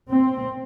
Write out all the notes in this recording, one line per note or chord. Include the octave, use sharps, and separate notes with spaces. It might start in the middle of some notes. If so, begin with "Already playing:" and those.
C4